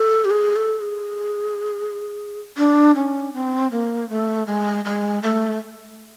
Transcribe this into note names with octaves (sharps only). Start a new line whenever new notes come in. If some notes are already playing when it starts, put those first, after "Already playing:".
Already playing: A4
G4
G#4
A4
G#4
D4
C#4
C4
A#3
A3
G#3
G#3
A3